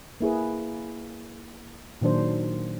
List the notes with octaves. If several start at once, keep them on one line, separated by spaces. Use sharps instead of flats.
A#3 E4 G#4 B4
A#2 D#3 F#3 D4 C5